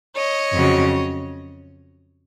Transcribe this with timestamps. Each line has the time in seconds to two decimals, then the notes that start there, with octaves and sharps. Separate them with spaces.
0.15 C#5 D#5
0.54 F2 C#3 F#3